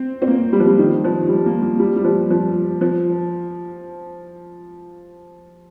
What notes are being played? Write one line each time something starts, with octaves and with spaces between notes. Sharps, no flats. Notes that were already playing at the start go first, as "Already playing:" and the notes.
Already playing: C4
C4
A#3
G3
F3
G3
D#3
F3
G3
A#3
A#3
G3
G3
F3
F3
F3